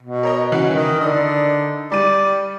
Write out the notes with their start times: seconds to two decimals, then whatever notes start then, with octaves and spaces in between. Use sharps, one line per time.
0.03 B2
0.23 A#4 C#5 D#5
0.52 E3 C#4 F#4
0.71 D#3 E3
1.01 D3 D#4 D5 D#6
1.92 G3 D5 D#7